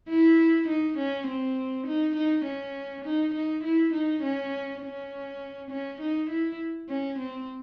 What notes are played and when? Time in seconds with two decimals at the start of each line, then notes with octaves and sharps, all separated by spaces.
0.09 E4
0.68 D#4
0.98 C#4
1.27 C4
1.87 D#4
2.16 D#4
2.45 C#4
3.05 D#4
3.34 D#4
3.64 E4
3.93 D#4
4.23 C#4
4.82 C#4
5.71 C#4
6.01 D#4
6.30 E4
6.89 C#4
7.19 C4